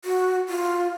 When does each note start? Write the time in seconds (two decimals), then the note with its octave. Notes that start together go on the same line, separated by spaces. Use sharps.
0.05 F#4
0.49 F4